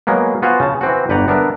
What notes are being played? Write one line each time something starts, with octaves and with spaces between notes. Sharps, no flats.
F#3 G#3 A#3 B3
B3 F4 F#4 C5 F5 G#5
C#3 A5
E3 C4 F#4
G1 B4 D5 F#5 G5 A#5
B3 D4 A#4 E5